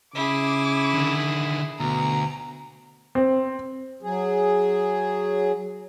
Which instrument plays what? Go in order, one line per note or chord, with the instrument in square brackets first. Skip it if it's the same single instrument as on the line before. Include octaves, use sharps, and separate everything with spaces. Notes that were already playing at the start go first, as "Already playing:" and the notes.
[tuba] C#3 [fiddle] E4 G#4 [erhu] D6
[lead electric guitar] D3 D#3
[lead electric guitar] D2 [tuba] B2 [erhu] A#5
[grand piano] C4
[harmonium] F#3 G#4